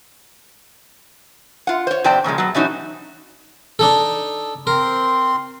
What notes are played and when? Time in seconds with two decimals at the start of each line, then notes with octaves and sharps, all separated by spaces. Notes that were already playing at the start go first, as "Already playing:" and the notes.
1.67 F4 F#5
1.87 C5 C#5
2.04 F2 C3 C5 D5 G5 A5
2.24 A#2 C#3 F3 G#3
2.38 B2 F#3
2.55 B2 E3 F#3 C#4 D#4 F#4
3.79 D4 D#4 A4
4.67 C4 A#4 C6